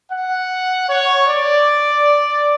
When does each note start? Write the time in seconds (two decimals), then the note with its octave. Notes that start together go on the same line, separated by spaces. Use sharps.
0.10 F#5
0.89 C#5
1.27 D5